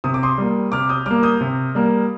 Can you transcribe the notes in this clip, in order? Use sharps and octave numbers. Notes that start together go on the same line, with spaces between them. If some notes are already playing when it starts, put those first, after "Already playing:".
C3 D#6
D6
C6 D#6
G3 A#3
C3 D6 F6
D#6 G6
G3 A#3 D6 F6
D#6 G6
C3
G3 A#3